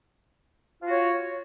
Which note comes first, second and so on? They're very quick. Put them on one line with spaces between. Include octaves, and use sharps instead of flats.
F4 F#4 C#5